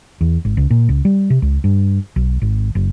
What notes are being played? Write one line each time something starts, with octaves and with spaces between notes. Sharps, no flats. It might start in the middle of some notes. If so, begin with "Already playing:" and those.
E2
G#1
C#2
A#2
C#2
G3
C3
C#2
G2
B1
G#1
F#1